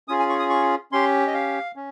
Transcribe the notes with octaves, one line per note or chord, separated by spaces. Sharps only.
C#4 F4 G#4 D#6
G#5
C#6
D#6
C#6
C#4 G4 C6
D#5
F5
C#4